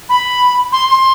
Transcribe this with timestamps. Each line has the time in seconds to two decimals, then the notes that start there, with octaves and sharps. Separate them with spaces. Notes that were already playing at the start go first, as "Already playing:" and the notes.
0.09 B5
0.72 C6
0.88 C6